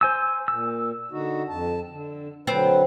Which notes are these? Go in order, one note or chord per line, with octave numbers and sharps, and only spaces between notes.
C5 G#5 E6
A#2 E6
D3 D#4 F#4
F2 A5
D3
D3 F#3 C4 B4